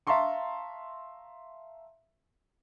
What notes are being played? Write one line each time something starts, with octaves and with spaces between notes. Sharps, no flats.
E5 F5 A5 A#5 C6 C#6